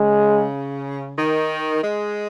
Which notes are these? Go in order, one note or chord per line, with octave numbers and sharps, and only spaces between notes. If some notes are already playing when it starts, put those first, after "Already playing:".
Already playing: C#3 G#3
D#3
G#3